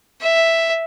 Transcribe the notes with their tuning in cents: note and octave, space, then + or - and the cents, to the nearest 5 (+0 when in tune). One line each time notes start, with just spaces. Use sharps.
E5 +0